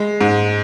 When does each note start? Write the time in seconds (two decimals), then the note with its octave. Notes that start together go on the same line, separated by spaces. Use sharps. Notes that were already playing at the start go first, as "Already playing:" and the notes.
Already playing: G#3
0.21 G#2